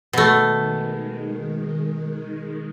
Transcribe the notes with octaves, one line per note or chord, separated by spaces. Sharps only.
B2 D#3 G#3 A3